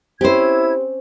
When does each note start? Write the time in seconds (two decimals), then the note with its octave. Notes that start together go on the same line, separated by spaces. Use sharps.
0.21 C4 C#4 E4 G4 C5 G#6